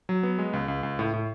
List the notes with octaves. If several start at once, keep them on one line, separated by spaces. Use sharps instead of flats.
F#3
B3
G#3
C#2
C#2
C#2
A2
A2